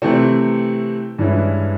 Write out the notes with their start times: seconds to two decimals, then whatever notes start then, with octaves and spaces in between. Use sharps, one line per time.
0.02 C3 E3 A3 C4
1.19 G2 E3 G#3 C#4 E4